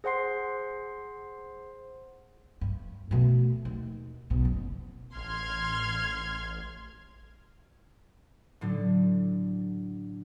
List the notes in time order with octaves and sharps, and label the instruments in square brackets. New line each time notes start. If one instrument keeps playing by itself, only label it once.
[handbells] G#4 C5 F#5 C6 C7
[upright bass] G2
B2 A3
D#2
B1 B2
F#1
[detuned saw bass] A1 [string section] C6 F6 G#6
[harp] A2 D3 F#3